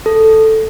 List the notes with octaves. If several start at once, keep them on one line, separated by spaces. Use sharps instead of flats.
A4